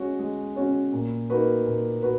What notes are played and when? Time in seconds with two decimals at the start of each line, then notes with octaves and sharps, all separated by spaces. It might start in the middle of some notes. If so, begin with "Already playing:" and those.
Already playing: G#3 C#4 F#4 C#5
0.19 G#3
0.56 C#4 F#4 C#5
0.93 A#2
1.30 A#3 D#4 F#4 B4
1.66 A#2
2.03 F#4 B4